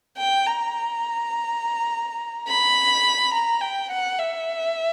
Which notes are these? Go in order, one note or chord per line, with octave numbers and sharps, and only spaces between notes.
G5
A#5
B5
A#5
G5
F#5
E5